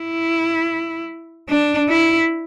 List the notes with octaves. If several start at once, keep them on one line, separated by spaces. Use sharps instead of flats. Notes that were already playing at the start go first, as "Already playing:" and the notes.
Already playing: E4
D4
E4